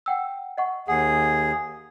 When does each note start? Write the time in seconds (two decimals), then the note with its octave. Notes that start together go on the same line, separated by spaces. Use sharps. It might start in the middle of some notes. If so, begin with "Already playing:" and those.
0.06 F#5 G5 E6
0.57 D#5 F#5 C#6
0.88 D#2 G#4 F#5 C7